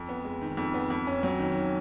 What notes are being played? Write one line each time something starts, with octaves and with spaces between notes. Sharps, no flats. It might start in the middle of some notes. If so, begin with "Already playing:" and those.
Already playing: F2
B3
G#3
D#3
F2
B3
F2
C#4
F#3
D#3